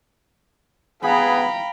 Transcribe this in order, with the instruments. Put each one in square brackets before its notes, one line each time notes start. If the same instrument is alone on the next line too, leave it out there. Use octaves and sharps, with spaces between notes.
[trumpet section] B3 G#4 [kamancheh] F5 G5 [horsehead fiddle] A#5 B5